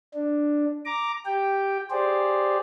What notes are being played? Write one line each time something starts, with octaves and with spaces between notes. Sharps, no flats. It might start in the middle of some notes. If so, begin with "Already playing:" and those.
D4
A#5 D6
G4 G5
G4 G#4 C5 D5